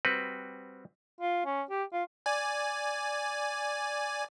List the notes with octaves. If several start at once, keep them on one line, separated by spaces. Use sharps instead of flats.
G3 C4 F#4 B4
F4
C#4
G4
F4
D5 G#5